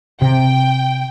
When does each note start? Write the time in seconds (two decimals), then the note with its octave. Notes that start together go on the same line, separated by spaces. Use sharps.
0.22 C3 G5